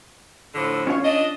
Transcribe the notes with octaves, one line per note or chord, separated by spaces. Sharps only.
A2 D3 F3
C#4 F4 C#5
D4 D#5